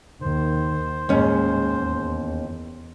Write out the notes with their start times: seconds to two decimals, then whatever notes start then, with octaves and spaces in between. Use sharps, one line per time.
0.22 D#2 D#3 C5
1.09 D#2 A2 G#3 C#4
1.73 E2